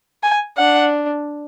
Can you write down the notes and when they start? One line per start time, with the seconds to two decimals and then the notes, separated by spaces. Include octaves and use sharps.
0.23 G#5
0.57 D4 F#5